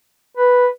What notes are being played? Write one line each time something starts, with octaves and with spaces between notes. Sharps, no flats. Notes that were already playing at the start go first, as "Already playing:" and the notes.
B4